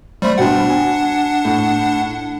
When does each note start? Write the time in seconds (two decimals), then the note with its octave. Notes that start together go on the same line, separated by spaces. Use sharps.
0.22 G3 A3 C5 B5
0.38 B2 D4 F#5 G5
0.70 G#5
1.45 A2